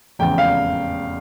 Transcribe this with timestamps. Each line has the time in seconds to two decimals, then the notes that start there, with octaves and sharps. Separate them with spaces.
0.19 F1 E2 C#3 G5
0.38 F5